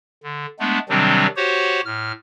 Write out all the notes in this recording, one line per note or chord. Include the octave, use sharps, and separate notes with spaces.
D3
G#3 A3 B3 D4
C3 D#3 F#3 G3 C4 D4
F#4 G4 C5 C#5 F#5
A2 F6